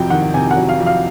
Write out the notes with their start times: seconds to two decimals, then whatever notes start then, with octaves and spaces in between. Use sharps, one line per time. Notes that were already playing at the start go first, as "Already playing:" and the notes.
Already playing: F2 C3 F#3 G5
0.10 D#3 F#5
0.34 C3 G#5
0.51 F#5
0.57 F#3
0.69 F5
0.80 F2
0.86 F5